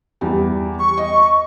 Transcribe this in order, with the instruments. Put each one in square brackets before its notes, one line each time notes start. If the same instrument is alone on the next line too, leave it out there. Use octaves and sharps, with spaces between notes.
[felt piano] E2 G3
[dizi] C#6
[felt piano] D#5